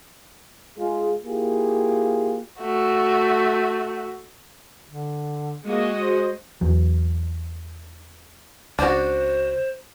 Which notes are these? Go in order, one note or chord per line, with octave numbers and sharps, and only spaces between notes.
G#3 F4 G#4
A#3 E4 F4 G4 G#4
A3 F#4
D3
G#3 A#3 F#4 D#5
C5
E2 F#3
C#2 D4 F#4 C5